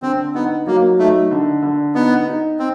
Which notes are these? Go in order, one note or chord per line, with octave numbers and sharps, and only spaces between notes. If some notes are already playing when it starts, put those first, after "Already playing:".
D3 C4
B3 D#4
F#3 A#3
A3 D#4
D3
D3
B3 D#4
D#4
C4